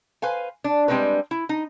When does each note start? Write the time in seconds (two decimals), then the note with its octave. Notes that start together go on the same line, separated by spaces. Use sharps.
0.22 B4 C5 F5 G#5
0.64 D4
0.88 G3 G#3 C4 D4 A4 B4
1.31 E4
1.49 D#4